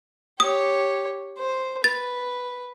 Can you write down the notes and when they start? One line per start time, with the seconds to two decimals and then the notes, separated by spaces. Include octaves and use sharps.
0.40 G4 C#5 D#6
1.38 C5
1.84 B4 A6